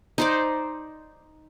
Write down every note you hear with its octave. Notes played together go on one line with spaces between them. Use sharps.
D#4 C5 D5